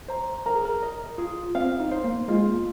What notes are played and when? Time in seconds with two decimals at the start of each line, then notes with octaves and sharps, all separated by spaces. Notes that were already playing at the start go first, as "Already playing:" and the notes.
0.08 C5 A#5
0.46 A#4 A#5
0.55 G#4
0.65 A#4
0.82 D#5
1.18 F4 G#4
1.55 C4 F5
1.80 D#4
1.91 C5
2.04 A#3
2.28 G#3 F4
2.47 A#3